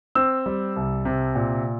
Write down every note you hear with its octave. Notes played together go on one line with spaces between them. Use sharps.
C4 E6
G3
C2
C3
A#2